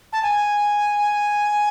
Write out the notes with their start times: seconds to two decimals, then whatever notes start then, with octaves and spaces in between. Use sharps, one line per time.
0.13 A5
0.22 G#5